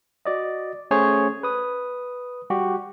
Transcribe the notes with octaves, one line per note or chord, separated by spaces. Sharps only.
F#4 D5 D#5
A3 C#4 G#4 C5 C#5
B4 D#6
G3 F#4 G4